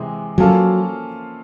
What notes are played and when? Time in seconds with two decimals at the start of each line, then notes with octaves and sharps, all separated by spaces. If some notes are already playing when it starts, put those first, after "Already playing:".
Already playing: C3 E3 G#3
0.38 F3 F#3 A#3 C#4 F4 A4